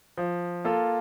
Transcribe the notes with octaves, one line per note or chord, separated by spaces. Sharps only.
F3
A#3 F4 A4